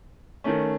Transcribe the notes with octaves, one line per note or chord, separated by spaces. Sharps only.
D#3 A3 C#4